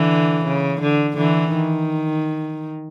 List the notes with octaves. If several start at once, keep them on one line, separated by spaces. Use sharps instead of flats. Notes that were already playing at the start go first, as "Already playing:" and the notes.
Already playing: D3 E3
C#3
D3
D3 E3
D#3